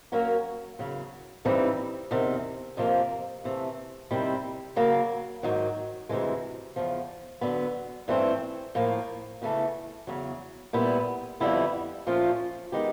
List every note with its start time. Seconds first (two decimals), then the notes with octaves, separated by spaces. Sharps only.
0.12 F#3 A#3 C#4 F#4 A#4
0.79 E2 C#3 F#3
1.45 G2 E3 G3 C4 D#4
2.11 E2 C3 D#3
2.77 F2 C3 F3 A#3
3.44 C3 E3 A3
4.11 C3 D#3 G3 C4 E4
4.76 C#3 F#3 A#3
5.43 G#2 D#3 F#3
6.09 D2 C3 E3 G#3
6.76 E2 C#3 F3
7.41 D3 F#3 B3
8.08 G2 E3 A3 C4
8.75 A2 F3 A#3
9.42 E2 C#3 E3 A3
10.07 E2 C#3 F#3
10.73 A#2 G3 B3 E4
11.40 F2 D3 G3 B3 E4
12.07 A#2 F3 A3 C#4 F4
12.72 D#3 G#3 B3 D#4 G4